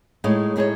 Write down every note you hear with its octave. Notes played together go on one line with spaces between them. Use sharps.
A2 G#3 D#4 G#4 C#5
A2 G#3 D#4 G#4 C#5